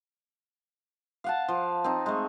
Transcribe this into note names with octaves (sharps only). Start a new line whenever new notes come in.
F5 F#5 A5
F3
C4 D#4
G#3 A3